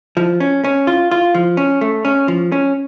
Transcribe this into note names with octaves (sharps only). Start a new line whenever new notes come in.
F3
C#4
C#4
F4
F4
F3
C#4
A3
C#4
F3
C#4